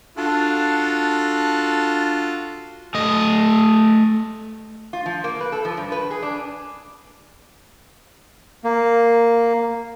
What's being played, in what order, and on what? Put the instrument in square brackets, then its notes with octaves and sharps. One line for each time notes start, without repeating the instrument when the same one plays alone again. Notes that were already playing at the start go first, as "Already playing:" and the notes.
[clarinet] D4 [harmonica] F4 F#4 A4
[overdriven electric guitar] A3 D#5
[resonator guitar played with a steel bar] F4
F3
A#3
B4
A4
F3
G2
B4
G#4
D4
[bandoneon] A#3